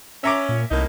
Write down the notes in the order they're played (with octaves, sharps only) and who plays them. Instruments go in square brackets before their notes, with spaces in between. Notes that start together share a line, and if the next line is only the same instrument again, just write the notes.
[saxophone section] C#4 [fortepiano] E5 A#5 D6
[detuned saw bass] A#2
[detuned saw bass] C2 [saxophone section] A2 A#3 D#4